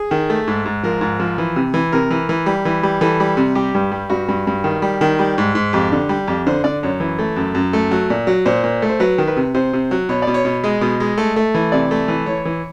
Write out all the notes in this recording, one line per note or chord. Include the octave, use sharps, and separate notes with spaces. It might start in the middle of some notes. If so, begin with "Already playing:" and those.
Already playing: G#4
D#3
A3
G#2
G#2
F3 A#4
G#2
F3
E3
C3
E3
C3 A#4
E3
E3
G3
E3
G3
E3 A4
G3
C3
G3 G4
G2
G3
G2 F#4
G2
G2
D#3
G3
D#3
G3
G#2
G#2
F2 G4
D3
G3
F2 G4
D3 C5
D3 D5
F#2 C#5
E3
A3
F#2
F#2
A3
F#3
A#2
F#3
A#2 C5
A#2
A3
C5
F#3 B4
D#3
B4
C3
C3 C5
C3
F#3
B2 C#5
B2 D5
C#5
B2
G#3 D#5
B2
G#3
A3
A3
E3
C3 D5
A3
E3
E3 C#5
E3